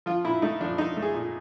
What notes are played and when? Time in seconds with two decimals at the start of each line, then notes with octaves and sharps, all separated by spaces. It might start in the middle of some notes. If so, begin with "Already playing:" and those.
0.06 F3 F4
0.24 A#2 E4
0.42 A3 D#4
0.61 F3 D4
0.78 F3 D#4
0.97 A3
1.02 G#4
1.14 A#2